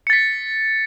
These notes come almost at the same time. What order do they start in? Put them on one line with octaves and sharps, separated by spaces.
C#7 A6 B6